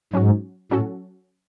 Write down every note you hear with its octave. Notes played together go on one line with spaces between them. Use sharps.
G#2 F#3 C#4 F#4
A2 F#3 C#4 F#4 A4